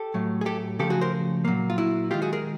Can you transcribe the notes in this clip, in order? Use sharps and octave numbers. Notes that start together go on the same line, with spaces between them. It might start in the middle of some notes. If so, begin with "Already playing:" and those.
Already playing: G4 A4
A2 F#3 A3
G#4
G4 A4
C#3 F3 A3 G4 A4
F#4 G#4
A#4 C5
A#2 F#3 A#3
F4
E4 F#4
D#3 G#3 F4 G4
F#4 G#4
G#4 A#4